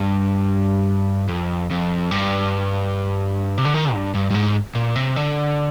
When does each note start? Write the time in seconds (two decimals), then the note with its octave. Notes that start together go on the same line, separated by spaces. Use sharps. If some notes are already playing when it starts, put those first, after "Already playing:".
Already playing: G2
1.29 F2
1.70 F2
2.11 G2
3.58 C3
3.65 D3
3.74 D#3
3.93 G2
4.14 G2
4.31 G2
4.34 G#2
4.75 A#2
4.95 C3
5.16 D3